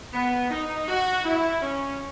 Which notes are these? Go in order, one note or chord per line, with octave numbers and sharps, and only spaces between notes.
B3
D#4
F#4
E4
C#4